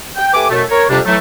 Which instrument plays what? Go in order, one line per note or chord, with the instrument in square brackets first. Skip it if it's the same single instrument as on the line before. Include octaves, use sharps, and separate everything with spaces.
[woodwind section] G5
A3 G4 B4 G#5 D6
F#2 B2 A3
A#4 C#5
F2 C3 G3 D4
E3 F#3 A3